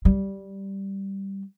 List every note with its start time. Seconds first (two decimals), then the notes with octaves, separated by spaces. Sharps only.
0.05 G3